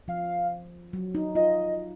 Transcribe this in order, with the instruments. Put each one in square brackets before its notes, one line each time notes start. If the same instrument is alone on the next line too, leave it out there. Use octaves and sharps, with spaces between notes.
[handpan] F3 [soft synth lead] F5
[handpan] F#3
D#4
[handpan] F4 [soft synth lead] D#5